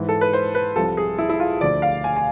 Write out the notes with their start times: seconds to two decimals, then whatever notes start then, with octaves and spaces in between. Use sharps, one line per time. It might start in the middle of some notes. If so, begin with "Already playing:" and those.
Already playing: G#2 E3
0.09 A4
0.21 B4
0.33 C5
0.55 B4
0.76 C2 C3 F3 A4
0.97 G#4
1.18 E4
1.29 E4
1.40 F4
1.61 D2 D3 F3 D5
1.82 F5
2.04 G#5
2.16 G#5